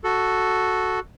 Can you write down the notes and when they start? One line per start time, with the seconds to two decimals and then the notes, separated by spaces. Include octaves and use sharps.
0.04 F#4 A4